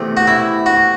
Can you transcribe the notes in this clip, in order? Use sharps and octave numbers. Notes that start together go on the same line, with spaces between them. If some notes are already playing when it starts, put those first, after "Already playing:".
Already playing: E2 C3 A3
F#4
E4
F#4